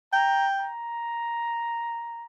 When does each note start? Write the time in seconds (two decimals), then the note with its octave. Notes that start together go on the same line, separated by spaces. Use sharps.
0.13 G5 A#5
0.61 A#5